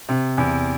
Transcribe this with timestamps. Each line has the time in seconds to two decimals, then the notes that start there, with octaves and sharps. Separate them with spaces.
0.09 C3
0.38 E2